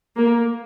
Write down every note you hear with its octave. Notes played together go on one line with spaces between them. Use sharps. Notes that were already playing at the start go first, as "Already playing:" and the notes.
A#3